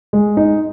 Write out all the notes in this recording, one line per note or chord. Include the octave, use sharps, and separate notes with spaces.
G#3
D#4